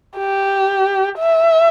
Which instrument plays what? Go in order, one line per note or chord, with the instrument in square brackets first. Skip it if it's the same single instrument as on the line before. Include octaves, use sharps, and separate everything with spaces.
[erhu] G4
E5